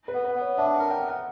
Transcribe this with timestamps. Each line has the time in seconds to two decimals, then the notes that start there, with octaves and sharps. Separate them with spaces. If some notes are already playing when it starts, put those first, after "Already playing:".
0.08 B4
0.14 B3
0.24 B4
0.35 B3
0.41 C#5
0.58 D4 E5
0.74 F#5
0.79 A#4
0.90 G5
1.01 B3
1.08 F#5